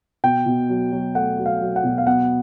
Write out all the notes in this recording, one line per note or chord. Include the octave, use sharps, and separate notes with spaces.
B2 G5
B2
F#3
F#3
A3 F#5
F#3
F5
F#3
F#5
B2
F5
B3 F#5